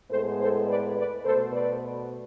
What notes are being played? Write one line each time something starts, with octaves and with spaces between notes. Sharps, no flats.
A2 G#3 B3 A4 C5
A4 C5
B4 D5
B4 D5
B2 A3 A4 C5
B4 D5